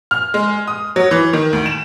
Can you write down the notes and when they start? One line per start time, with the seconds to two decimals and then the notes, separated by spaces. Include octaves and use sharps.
0.11 F6
0.34 G#3
0.67 D#6
0.96 F#3
1.11 E3
1.33 D#3
1.53 D2
1.66 E7